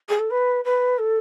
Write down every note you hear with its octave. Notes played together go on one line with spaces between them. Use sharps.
G#4
A4
B4
B4
A4